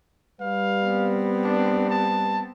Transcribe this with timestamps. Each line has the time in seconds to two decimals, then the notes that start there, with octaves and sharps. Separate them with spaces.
0.40 G3 B4 F5
0.83 B3 C4
1.44 D4
1.90 A5